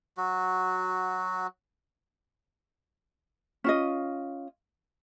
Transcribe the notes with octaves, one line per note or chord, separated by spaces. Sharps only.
F#3 F#4
C#4 F4 D#5